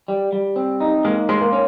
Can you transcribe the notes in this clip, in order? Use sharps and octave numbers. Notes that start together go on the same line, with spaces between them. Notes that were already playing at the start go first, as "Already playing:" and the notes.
G3
G3
C4
D#4
G#3 A#3
G#3 C5
A#3
C#4